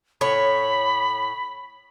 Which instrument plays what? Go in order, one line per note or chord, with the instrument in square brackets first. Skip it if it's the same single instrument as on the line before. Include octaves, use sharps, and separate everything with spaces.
[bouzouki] A2 C#5 [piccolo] B5